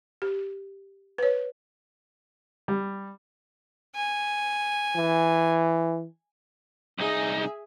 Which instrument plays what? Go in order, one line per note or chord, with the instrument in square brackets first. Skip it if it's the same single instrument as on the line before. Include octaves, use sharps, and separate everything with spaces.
[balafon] G4
B4 C#5
[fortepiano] G3
[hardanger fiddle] G#5
[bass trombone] E3
[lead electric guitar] C2 D#4 [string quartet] G#4 E5 G#5